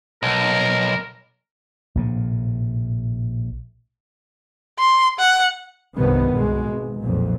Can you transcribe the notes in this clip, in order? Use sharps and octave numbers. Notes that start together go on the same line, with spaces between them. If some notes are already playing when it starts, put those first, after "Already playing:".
B1 A#4
A#1 A2 C3
C6
F#5
C2 G2 C3 D#3 B3
C2 B2 G#3
G#1
B1 F2 A#2